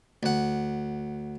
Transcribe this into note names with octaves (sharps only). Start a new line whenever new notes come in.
D2 F#5